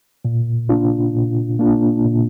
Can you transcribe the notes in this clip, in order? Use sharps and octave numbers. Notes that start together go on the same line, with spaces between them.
A#2
A#3 D4 F4
A#2
A#3 D4 F4
A#2